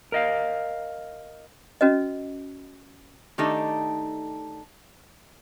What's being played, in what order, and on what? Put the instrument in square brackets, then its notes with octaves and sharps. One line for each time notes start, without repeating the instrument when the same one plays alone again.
[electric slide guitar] A#4 D#5 F5
[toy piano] C#4 F#4 B4 D#5
[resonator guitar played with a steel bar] D#3 A3 D4 D#4 G4 A4